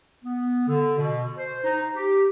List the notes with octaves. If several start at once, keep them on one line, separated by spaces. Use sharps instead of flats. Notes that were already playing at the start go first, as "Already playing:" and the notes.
B3
D3
B2
C5
D#4
G4